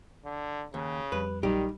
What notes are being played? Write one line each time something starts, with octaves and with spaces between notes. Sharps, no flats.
D3
D#2 C#3
F2 G3 B4
A#1 D#3 F#3 G3 D#4 G4